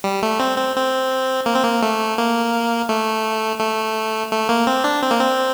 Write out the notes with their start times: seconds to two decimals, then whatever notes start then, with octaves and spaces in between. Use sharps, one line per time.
0.04 G3
0.22 A3
0.40 C4
0.58 C4
0.76 C4
1.46 A#3
1.54 C4
1.63 A#3
1.82 A3
2.18 A#3
2.89 A3
3.60 A3
4.32 A3
4.49 A#3
4.67 C4
4.84 D4
5.03 C4
5.11 A#3
5.20 C4